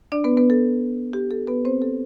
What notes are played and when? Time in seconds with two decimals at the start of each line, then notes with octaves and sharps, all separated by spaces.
0.12 D4 D5
0.24 B3 B4
0.37 B3 B4
0.50 A4
1.13 G4
1.31 A4
1.47 B3 B4
1.65 C4 C5
1.82 A4